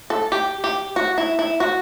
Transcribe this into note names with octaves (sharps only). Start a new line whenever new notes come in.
A4
G4
G4
F#4
E4
E4
F#4